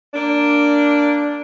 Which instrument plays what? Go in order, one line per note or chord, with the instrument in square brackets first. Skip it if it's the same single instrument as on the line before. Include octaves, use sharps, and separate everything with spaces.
[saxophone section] A#3 D4